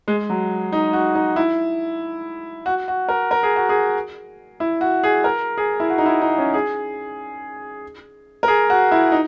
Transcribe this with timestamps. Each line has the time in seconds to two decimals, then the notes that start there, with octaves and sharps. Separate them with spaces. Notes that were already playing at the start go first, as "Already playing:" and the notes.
0.08 G#3
0.30 F#3
0.72 D#4
0.93 F#4
1.15 D#4
1.36 E4
2.66 F#4
2.88 F#4
3.09 A#4
3.31 A#4
3.43 G#4
3.56 F#4
3.69 G#4
4.60 E4
4.81 F#4
5.03 G#4
5.24 A#4
5.57 G#4
5.80 E4
5.90 F#4
5.98 D#4
6.06 E4
6.21 D#4
6.38 C#4
6.54 G#4
8.43 A#4
8.48 G#4
8.70 F#4
8.91 E4
9.12 D#4